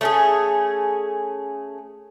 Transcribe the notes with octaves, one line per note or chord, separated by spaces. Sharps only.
A3 C#4 G#4